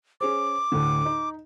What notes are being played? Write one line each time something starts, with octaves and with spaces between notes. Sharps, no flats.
C#4 G#4 C5 D6
D2 A2 D3
D#4